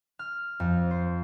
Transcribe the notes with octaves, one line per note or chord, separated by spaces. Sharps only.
F6
F2
C5